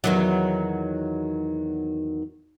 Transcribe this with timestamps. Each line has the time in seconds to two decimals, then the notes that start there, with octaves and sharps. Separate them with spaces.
0.04 E2 D#3 F#3